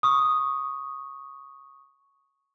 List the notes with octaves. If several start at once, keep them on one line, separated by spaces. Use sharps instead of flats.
C#6 D#6